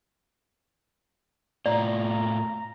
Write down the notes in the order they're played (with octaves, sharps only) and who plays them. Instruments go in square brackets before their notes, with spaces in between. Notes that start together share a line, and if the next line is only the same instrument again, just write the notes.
[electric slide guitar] A2 F4 [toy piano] D5 [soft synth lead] A#5